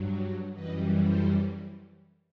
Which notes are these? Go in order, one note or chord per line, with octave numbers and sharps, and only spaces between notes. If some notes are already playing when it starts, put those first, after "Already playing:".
Already playing: G2 F#3
F#2 E3 G3 B4 D#5
A4 C5